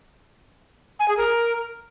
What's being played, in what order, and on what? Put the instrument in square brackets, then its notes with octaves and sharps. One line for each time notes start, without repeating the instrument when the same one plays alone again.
[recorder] G#5
G#4
A#4